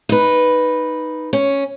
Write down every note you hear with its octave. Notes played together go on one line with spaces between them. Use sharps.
D#4 B4
C#4